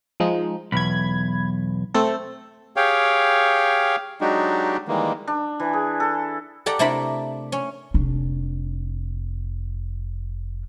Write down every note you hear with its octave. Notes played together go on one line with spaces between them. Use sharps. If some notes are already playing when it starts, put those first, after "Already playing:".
F3 G#3 D#4
B1 E2 B5 G#6
A3 C4 A4
G4 G#4 C#5 F5 G5
F#3 G#3 D4 D#4 F#4 G4
D#3 E3 G3 G#3 A#3
D4
E3
G#4
A4
G4 A4 D5 F#5 A#5
C3 A3 D4 E4 A#4 B5
C#4
F1 D4